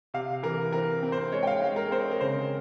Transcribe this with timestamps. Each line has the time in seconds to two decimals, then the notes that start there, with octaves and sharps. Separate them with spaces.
0.14 C3 F5
0.43 E3 A#4
0.72 C4 A#4
1.03 C4
1.12 C5
1.32 G#3 C#5
1.43 G5
1.47 F5
1.61 G#3
1.76 A#4
1.91 C4 C5
2.11 A#4
2.21 C#3 C5